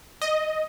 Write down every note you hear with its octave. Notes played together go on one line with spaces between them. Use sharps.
D#5